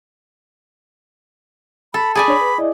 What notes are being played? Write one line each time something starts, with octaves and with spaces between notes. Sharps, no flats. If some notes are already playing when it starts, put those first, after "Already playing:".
A4 B5
G#4 D5 G#5 B5
D4 C#5
B4
E4 D5 D#5